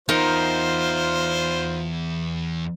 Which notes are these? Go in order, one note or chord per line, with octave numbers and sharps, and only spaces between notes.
E2 D#4 F4 A#4 C5